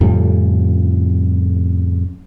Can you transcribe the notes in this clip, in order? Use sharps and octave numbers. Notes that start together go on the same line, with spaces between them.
F2 A2 C#3 G3